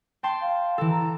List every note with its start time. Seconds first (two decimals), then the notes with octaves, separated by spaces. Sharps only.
0.23 G5 A5 C6
0.42 F5
0.78 E3 A4
0.90 A#5